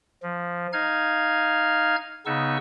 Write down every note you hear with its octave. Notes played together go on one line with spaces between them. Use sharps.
F3
D#4 F5 F6 G#6
C#3 B3 D#4 C#6 E6